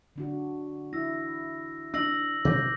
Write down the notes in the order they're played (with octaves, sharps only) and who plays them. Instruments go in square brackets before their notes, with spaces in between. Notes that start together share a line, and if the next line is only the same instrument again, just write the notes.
[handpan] D3 D4 F#4
[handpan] E4 [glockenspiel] E6 A#6
[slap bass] D4 [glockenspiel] E6 A#6 F#7
[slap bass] B2 [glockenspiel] D6 G6 A#6